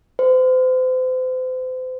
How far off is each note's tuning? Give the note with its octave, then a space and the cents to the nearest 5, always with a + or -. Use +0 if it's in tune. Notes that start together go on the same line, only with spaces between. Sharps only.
C5 -35